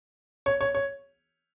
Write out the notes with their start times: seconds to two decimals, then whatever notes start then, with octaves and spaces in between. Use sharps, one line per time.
0.46 C#5
0.61 C#5
0.75 C#5